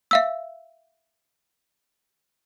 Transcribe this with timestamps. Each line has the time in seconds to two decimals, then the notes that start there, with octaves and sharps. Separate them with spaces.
0.11 E5 F5 E6